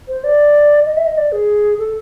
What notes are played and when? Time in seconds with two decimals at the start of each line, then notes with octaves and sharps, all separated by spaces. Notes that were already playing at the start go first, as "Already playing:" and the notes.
0.08 C5
0.24 D5
0.86 D#5
0.97 E5
1.06 D#5
1.18 D5
1.32 G#4
1.79 A4